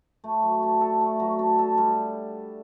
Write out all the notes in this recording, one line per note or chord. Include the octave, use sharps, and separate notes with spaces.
A3
F#3
D4
A4
A3
F#3
D4
A4
G3